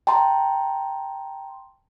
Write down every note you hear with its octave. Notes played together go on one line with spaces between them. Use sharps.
G5 A5 A#5 C6